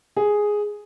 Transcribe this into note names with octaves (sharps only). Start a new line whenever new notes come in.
G#4